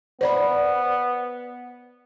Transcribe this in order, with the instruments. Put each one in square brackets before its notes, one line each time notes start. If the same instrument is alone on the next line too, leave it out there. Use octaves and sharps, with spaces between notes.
[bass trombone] B3 [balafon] C5 D5 B5